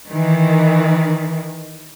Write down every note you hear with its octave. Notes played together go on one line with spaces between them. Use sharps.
D#3 E3